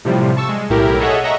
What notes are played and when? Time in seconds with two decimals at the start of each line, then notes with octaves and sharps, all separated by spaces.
0.05 A2 C3 F3 G3
0.37 A5 C#6 E6
0.49 G#3
0.70 B1 A2 E4 G4 A#4
1.00 G#4 A4 C#5 D#5 E5 F#5
1.24 D#5 E5 F#5 A#5 C#6